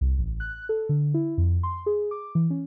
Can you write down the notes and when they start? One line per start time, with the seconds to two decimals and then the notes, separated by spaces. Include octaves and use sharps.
0.01 C2
0.18 A1
0.40 F#6
0.69 A4
0.89 D3
1.14 E4
1.38 F2
1.63 C6
1.86 G#4
2.11 D6
2.35 E3
2.50 C#4